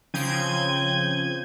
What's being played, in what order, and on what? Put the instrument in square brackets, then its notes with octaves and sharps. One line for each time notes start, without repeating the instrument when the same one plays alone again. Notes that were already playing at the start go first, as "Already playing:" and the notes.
[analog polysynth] C#3 F3 C4 G6 G#6 D#7